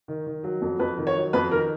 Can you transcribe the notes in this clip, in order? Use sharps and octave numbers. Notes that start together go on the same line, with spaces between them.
D#3
D#3
F#3
F2
F2 B4
D#3
C#5
F#3
F2 B4
D#3 A#4